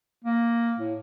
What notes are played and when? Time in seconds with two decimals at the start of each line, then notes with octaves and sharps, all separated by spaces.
0.24 A#3
0.79 A2